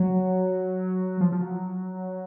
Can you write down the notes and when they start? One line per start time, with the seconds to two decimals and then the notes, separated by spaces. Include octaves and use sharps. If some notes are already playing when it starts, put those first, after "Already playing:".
Already playing: F#3
1.21 F3
1.32 F3
1.42 F#3